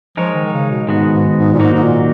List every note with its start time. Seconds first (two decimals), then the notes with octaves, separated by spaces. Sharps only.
0.17 F3 G#3 D#4 A#4 C#5
0.35 D#3
0.45 D#3
0.53 C#3
0.70 B2
0.88 G#2 D#3 G#3 B3 F#4
1.11 G#2
1.36 G#2
1.53 A#2
1.59 G#2 D#3 F#3 A#3 D#4 F#4
1.74 G#2
1.83 A#2